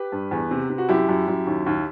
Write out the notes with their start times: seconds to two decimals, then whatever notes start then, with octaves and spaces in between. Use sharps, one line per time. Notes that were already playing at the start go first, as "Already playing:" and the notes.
Already playing: G4 B4
0.12 G2
0.31 E2
0.51 C3
0.70 C3
0.78 F#4
0.89 F#2 E4 G4
1.09 F#2
1.28 F#2
1.47 D#2
1.66 D#2